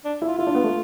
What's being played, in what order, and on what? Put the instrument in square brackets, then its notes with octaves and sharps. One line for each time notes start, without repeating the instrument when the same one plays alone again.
[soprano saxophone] D4
[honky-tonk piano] E4
[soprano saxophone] F4
[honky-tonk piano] E4 [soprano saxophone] F4
[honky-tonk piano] D4
B3
A3